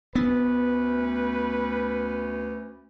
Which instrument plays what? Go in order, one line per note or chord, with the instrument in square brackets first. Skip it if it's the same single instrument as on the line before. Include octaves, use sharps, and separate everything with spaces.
[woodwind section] D2 C#4 [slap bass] B3 [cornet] B4